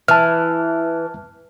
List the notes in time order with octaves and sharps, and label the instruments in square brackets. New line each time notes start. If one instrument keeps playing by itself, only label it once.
[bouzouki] E3 [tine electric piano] A5 F6